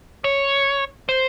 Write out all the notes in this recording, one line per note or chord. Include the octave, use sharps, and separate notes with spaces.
C#5
C5